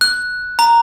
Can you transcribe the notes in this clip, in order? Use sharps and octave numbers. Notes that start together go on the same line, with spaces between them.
F#6
A#5